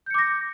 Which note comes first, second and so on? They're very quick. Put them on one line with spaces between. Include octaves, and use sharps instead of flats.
G6 C#7 D6 A#6